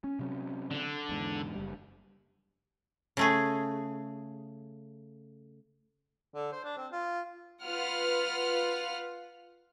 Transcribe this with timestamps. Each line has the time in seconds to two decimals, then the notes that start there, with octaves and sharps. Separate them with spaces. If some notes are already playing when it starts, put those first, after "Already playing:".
0.04 C#4
0.19 C3 F#3 C#4
0.71 D3 D4
1.09 E2 G#2
1.55 F#1 G3
3.17 C#3 A3 G#4
6.34 D3
6.52 C5
6.64 D4
6.77 C4
6.92 F4
7.62 F4 B4 F#5 F6